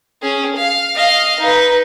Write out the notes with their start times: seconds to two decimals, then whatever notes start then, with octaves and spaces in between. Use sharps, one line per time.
0.22 C#4 G#4
0.56 F5
0.96 D#5 F5
1.40 D#4 B4